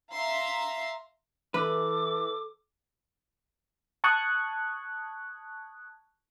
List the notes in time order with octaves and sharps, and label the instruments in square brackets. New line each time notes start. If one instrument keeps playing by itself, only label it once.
[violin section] E5 F5 A#5 C6
[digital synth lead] E3 [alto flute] A4 [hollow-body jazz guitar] B4 [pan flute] D6
[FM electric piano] A5 C#6 D#6 F#6 G#6